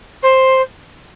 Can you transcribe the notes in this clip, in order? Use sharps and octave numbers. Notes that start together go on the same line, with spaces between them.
C5